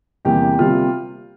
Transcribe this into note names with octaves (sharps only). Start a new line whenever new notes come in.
E2 C3 G3 A#3 G4
C3 G3 A#3 F4